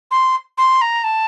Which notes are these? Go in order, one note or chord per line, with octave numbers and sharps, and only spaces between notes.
C6
C6
A#5
A5